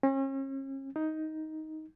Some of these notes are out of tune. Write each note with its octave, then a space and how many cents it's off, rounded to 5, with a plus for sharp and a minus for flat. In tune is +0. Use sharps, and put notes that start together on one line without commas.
C#4 -40
D#4 +10